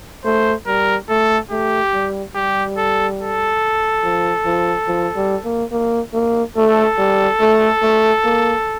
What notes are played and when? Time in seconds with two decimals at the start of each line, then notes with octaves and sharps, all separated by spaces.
0.25 A3 C5
0.67 G3 A#4
1.09 A3 A4
1.51 A3 G4
1.94 G3
2.35 G3 G4
2.78 A4
3.20 A4
4.03 F3
4.45 F3
4.88 F3
5.16 G3
5.45 A#3
5.72 A#3
6.13 A#3
6.56 A3 A4
6.98 G3
7.40 A3
7.82 A3
8.25 A#3